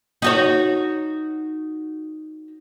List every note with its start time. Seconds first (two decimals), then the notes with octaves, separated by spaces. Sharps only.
0.22 D#4 F#4 C#5